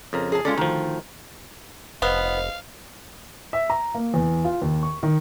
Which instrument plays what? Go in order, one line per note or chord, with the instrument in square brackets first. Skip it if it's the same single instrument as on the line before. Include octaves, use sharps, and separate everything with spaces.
[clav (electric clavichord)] F2 C#3 A#4
[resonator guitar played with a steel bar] G#4 A5
[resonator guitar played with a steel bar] G#3 C#4 A4 [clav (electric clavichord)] F4 D5
[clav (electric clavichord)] D2 F3 [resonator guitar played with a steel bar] D#3
[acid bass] F1 [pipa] B3 [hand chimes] C5 D#5 [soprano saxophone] F5
[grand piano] E5
A#5
A#3
E2
F4
D#2
C#6
D#3